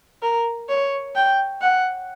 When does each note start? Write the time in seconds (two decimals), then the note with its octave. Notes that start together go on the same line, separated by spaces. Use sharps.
0.22 A#4
0.69 C#5
1.16 G5
1.62 F#5